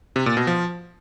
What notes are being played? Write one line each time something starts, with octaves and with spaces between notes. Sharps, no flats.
C3
A#2
B2
F3